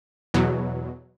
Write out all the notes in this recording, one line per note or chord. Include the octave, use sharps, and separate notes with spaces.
E2 B2 F#3